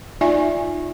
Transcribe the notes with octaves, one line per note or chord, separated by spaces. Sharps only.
D#4 F4 D5 E5 G#5